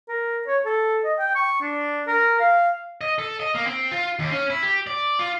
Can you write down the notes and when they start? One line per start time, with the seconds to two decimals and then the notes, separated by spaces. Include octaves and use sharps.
0.09 A#4
0.48 C#5
0.65 A4
1.04 D#5
1.19 G5
1.35 C#6
1.61 D4
2.07 A#4
2.40 F5
3.01 D#5
3.18 A4
3.40 D#5
3.55 A#3
3.67 C4
3.91 F4
4.19 D#2
4.31 C#4
4.50 E4
4.62 G4
4.87 D5
5.19 F4